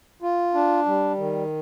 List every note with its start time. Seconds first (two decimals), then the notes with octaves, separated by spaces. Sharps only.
0.22 F4
0.54 D4
0.86 G3
1.18 D#3